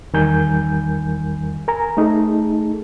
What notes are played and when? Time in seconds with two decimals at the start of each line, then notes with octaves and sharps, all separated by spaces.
0.13 E2 D#3 G3 A#4 G#5 G6
1.68 A#4 G#5 A#5
1.97 A3 D#4 G#4 A4